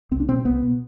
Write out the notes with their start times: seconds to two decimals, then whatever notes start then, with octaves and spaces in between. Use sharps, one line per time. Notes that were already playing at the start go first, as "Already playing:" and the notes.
0.11 C2 C4
0.20 D4
0.28 B2 C4
0.45 C2 B3
0.62 B2